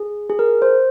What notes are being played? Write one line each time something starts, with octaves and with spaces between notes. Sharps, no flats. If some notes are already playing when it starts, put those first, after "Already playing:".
Already playing: G#4
G#4
A#4
C5